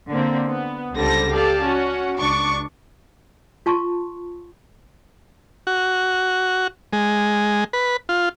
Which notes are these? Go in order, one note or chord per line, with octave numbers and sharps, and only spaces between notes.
D3 A#3 C4
B3
C#2 D3 G3 C4 A5 A#6
G4 A4 D5 F5 A5
C#4 F#4 F#5
C#2 D4 C#6 D6
F4 A5 C6 C#6
F#4
G#3
B4
F4